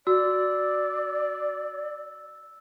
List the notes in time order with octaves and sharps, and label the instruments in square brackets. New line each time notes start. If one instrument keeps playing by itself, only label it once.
[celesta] F#4 [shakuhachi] D5 [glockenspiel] E6